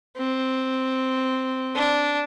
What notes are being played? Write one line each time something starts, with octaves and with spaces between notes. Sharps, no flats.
C4
D4